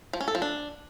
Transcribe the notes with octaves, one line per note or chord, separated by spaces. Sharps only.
F3
C#4
A4
F3
D4